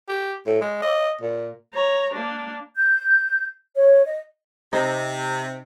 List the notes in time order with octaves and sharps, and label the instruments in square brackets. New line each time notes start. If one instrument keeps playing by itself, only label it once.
[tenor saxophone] G4
A2
G#3
D#5
A#2
[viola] C#5 A#5
A#3 D4
[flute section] G6
C#5
D#5
[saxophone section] C3 [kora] D#4